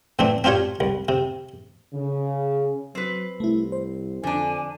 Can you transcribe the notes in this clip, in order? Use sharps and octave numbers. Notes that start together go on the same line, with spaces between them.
A2 E3 A3 C4 D4
C4 D4 F4 G4 C#5
C2
C3
C#3
F#3 C4 B4
C2 A3 E4
C5
F2 D3 D4 G#5